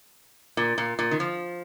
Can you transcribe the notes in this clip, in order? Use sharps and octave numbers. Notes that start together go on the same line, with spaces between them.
A#2
A#2
A#2
D#3
F3